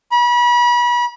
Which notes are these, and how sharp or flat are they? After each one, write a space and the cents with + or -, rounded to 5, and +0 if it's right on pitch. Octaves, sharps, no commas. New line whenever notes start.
B5 -35